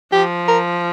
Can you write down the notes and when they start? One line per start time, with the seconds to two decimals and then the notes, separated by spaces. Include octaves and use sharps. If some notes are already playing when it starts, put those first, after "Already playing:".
0.12 F3 G4
0.48 A#4